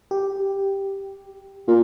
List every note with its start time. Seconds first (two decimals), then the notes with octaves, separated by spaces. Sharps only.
0.11 G4
1.68 A#2